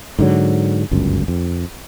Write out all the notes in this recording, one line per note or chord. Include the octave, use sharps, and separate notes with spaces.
G#2 D3 F#3
G1 C#2 F#2
F2